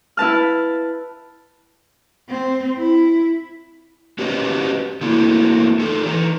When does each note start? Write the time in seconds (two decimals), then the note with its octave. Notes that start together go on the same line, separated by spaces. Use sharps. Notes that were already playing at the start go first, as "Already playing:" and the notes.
0.17 E4 B4 A5 F6
2.29 C4
2.78 E4
4.19 C#4 F#4 G4 B4 C#5 D#5
5.01 A3 A#3 C4 E4 F#4
5.80 D#4 F4 A4
6.06 E3 D#4 A#5